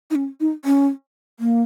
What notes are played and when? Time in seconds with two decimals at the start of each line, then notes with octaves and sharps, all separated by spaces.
0.11 D#4
0.15 C#4
0.40 D#4
0.65 C#4
1.40 A#3